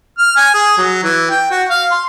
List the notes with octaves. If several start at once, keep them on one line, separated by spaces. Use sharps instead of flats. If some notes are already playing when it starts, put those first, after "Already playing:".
F6
G#5
G#4
F#3
E3
G5
F#4
F5
C6